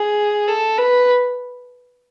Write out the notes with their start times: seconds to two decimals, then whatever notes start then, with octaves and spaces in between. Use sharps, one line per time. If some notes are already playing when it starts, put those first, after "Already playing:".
Already playing: G#4
0.48 A4
0.78 B4